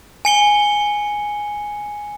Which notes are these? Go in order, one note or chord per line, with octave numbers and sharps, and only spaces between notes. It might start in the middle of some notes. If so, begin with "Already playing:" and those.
G#5 C#7 G7